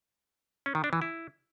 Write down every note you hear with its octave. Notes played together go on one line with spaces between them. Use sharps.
C#4
D#3
D4
E3
E4